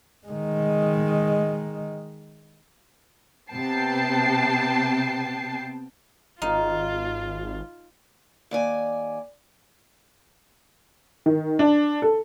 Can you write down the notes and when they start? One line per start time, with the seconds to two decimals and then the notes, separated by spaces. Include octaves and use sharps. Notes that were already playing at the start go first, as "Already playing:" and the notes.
0.27 D#3 G#3
3.50 C3 B3 G5 A5 C7
6.42 G#1 D#4 F4 F5
8.51 D#2 D5 G#5
11.26 D#3
11.59 D4
12.02 A4